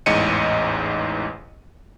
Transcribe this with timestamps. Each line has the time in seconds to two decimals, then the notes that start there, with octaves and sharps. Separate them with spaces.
0.06 A1 E2 G#2 D#5 C#7 D#7